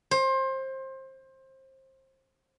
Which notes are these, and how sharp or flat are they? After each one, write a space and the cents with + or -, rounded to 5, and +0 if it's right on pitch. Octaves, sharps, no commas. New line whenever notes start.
C5 +25